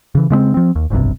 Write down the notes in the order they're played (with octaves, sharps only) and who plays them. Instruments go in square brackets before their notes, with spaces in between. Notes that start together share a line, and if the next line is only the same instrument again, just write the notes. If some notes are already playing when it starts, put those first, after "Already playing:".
[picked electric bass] C#3 E3
C#3 G#3 A3 C4
F3 C4
D#2
F1 B1 G2 C3